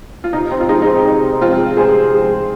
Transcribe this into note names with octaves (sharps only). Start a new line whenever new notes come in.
F4
C3 D#4
C4
F4
F3 G#3 D#4
D#4
C4
C3 D#4
F3 G#3 C4 F4
C3 G#4 C5
F3 G#3